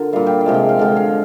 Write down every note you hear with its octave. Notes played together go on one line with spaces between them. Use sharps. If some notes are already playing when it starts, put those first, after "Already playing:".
Already playing: D3 F4 A#4
A#2 G3 F5
G5
F5
C3 F3 G#3
G5
F5
D3 G#3 G5
F5